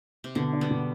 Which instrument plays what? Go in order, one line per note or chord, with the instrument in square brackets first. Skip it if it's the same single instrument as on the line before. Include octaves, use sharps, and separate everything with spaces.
[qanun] C3
[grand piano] B2 [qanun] D3
[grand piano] D4
[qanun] G3 B3
[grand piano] B2